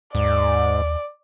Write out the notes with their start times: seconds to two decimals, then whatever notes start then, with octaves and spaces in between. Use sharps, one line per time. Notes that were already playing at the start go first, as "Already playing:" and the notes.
0.15 D#2 G#2 D5